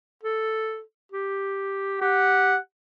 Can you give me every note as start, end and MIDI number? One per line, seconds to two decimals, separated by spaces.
0.23 0.81 69
1.12 2.00 67
2.01 2.56 67
2.01 2.59 78